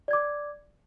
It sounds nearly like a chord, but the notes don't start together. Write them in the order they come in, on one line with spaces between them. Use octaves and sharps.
D5 G#6 D6